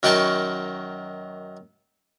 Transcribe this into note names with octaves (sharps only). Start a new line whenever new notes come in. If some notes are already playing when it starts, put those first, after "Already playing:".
F#2 D#3 F#4 G5 A5 C#6